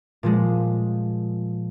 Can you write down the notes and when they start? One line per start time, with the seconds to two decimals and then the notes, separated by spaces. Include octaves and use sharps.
0.23 A#2 F3 G#3